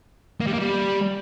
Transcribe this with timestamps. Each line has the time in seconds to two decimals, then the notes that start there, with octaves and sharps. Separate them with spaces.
0.40 A#3
0.47 G3
0.53 A#3
0.59 G3